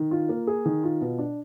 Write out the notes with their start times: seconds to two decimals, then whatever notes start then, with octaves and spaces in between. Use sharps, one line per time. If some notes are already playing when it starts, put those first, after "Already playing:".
Already playing: D#3
0.11 F4
0.29 A#3
0.47 G#4
0.65 D#3
0.84 F4
1.01 B2
1.19 D4